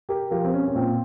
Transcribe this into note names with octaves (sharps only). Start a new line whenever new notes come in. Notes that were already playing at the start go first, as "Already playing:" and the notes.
G4 A#4
F3 G4 A#4
C4
C#4
C#4
A#2 C4